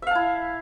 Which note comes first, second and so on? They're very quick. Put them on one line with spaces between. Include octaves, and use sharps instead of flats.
E5 F5 A5 E4